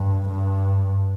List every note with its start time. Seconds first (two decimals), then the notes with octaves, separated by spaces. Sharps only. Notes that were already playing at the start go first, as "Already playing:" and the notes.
Already playing: G2
0.30 G2